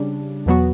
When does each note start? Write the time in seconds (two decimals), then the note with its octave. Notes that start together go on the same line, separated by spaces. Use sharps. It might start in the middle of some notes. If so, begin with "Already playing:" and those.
Already playing: C#3 G3 D4
0.46 E2 B2 F#3 B3 F#4